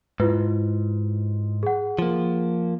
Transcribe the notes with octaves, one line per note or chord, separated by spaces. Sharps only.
G#2 E4 F4 B4
G#4 F#5
F3 A#3